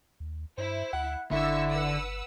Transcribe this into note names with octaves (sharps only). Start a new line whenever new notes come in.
D#2
G2 E4 C5
D2 F#5
G1 D3 E4 C#6 E6
B4 F#5 E6